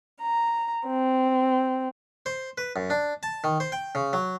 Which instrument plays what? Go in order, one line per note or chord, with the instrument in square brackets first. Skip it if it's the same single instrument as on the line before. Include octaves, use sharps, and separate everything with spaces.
[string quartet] A#5
C4
[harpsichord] C5
B4
F#2
D4
A5
D#3
C5
G5
C#3
F#3